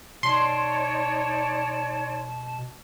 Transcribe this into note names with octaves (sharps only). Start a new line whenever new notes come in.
B2 D#4 C#5 D5 A5 C6